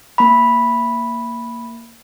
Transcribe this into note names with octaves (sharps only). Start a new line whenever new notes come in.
A#3 B5